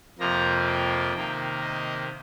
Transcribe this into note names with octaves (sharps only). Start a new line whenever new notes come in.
F2 C3 F3 A#3 A#5
G5
C3 D#3 A#3
D#5